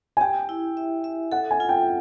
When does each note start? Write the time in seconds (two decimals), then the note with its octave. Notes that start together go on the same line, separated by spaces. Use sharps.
0.17 G#5
0.21 G4 G5
0.49 E4
0.77 E5
1.04 E5
1.32 A4 F#5
1.51 G#5
1.60 F4
1.69 G5